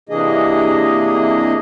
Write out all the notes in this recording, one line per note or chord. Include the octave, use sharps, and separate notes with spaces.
C3 E3 A#3 D4 G#4 D#5